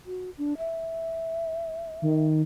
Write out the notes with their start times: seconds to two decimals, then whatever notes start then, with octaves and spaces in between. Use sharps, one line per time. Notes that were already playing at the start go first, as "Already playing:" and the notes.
0.06 F#4
0.38 D4
0.58 E5
2.02 D#3